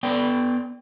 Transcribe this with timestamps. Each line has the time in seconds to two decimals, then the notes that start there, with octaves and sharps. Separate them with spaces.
0.03 B3 D5 G5